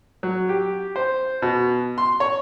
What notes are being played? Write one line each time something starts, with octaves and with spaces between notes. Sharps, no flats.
F#3
G4
C5
B2
C6
C#5